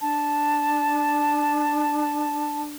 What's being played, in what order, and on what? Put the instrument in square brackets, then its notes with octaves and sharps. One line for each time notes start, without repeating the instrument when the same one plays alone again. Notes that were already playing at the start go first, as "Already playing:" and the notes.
[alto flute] D4 [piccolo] A5